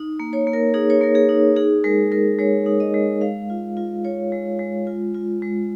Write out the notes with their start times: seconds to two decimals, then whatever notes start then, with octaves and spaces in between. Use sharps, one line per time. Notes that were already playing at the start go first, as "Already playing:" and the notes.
Already playing: D#4
0.20 A#3
0.33 C#5
0.47 A#3
0.53 A#4
0.74 D#4 G#4
0.90 C#5
1.01 A#3 A#4
1.15 G#4
1.29 D#4
1.56 D#4 G#4
1.84 G#3 A#4
2.12 G#3 A#4
2.39 G#3 C#5
2.66 D#4
2.80 D#5
2.94 G#3
3.21 G#3 F5
3.50 F4
3.77 F4
4.04 F4 C#5
4.32 G#3
4.59 G#3
4.87 F4
5.14 F4
5.42 G#3